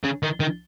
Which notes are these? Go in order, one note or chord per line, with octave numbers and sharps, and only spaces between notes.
C#3
D#3
D#3